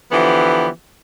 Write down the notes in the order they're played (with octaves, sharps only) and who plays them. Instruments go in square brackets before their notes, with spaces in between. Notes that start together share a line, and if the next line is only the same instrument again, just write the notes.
[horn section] D3 E3 F3 B3 G4